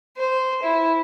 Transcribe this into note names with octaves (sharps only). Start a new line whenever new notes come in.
C5
E4